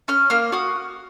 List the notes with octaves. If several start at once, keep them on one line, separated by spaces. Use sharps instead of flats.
C#4 F6
A#3 F6
F#4 D#6